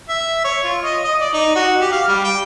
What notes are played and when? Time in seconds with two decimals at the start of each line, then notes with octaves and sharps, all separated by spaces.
0.09 E5
0.44 C#5
0.64 F4
0.83 D#5
1.04 D#5
1.20 D5
1.33 D#4
1.55 F#4
1.81 G4
1.92 F5
2.08 G3
2.24 G5